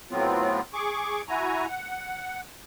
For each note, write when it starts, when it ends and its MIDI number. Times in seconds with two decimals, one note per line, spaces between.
0.11 0.60 45
0.11 0.60 54
0.11 0.60 59
0.11 0.60 60
0.11 0.60 65
0.73 1.22 68
0.73 1.22 85
0.73 1.22 86
1.29 1.66 64
1.29 1.66 66
1.29 1.66 80
1.29 1.66 82
1.68 2.41 78